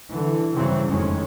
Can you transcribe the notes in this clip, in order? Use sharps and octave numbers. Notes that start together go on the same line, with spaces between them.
D3 E3
G2 C#3 E3 F#3 G3 C4
F#1 F2 A2 D#3 G#3 C#4